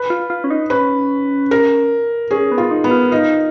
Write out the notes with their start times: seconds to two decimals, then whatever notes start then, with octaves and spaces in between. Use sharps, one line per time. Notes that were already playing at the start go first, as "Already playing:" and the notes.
Already playing: B4
0.10 F4
0.30 F4
0.44 C#4
0.50 D#4
0.70 C#4 B4
1.51 A#4
2.31 C#4 G#4
2.51 B3
2.58 F4
2.71 D#4
2.84 B3
2.91 F4
3.11 D#4 F4